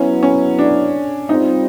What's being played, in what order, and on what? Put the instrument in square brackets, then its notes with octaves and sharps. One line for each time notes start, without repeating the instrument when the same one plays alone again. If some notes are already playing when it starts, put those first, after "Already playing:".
Already playing: [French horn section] F#3 B3 E4 [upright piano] C#4
[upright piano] C#4
D4
[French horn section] G3 C4 F4 [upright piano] D#4